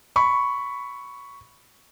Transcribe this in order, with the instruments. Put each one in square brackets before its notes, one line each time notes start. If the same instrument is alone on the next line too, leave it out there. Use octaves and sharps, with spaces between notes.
[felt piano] B5 C#6